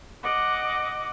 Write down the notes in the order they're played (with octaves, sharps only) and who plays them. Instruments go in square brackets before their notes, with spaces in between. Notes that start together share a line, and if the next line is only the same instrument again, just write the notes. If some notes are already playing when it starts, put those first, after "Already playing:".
[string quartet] D#5 F#5 D6